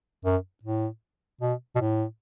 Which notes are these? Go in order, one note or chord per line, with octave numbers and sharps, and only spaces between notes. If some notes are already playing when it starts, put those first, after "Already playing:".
F#2
A2
B2
B2
A2